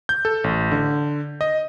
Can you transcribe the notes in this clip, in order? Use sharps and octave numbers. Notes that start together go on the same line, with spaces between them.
G6
A4
A1
D3
D#5